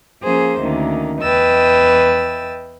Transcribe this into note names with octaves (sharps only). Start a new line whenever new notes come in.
F3 A#3 C#4 G#4 C5
D2 D#3 A#3 C#4
E2 B4 D#5 G5 E6 A6